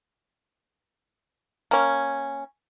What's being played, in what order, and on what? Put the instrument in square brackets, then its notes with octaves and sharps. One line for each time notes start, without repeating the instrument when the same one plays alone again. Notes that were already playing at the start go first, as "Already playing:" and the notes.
[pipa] A#3 C#4